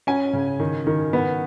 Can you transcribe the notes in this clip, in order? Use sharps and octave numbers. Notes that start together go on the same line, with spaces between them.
C#4 G#5
C#3
D#3
D#3
B3